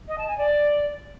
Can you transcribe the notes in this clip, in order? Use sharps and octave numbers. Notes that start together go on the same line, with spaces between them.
D#5
A5
G#5
D5